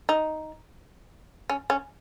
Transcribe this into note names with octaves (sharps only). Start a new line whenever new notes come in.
D#4
C#4
C#4